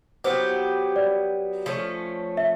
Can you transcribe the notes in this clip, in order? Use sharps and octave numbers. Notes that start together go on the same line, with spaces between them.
F#3 B3 E4 G4 C5
D5
F3 A3 C#4
E5